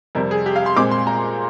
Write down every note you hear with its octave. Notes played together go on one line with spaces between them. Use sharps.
F2 C3 G3 A#4
G#4
G4
F5
C6
A#2 G#3 C4 D6
C6
A#5